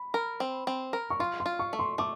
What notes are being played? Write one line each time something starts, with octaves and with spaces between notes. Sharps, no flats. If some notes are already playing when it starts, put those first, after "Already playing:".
Already playing: B5
A#4
C4
C4
A#4
C#6
F4 C6
C6
F4
C#6
A3
C6
A3 D6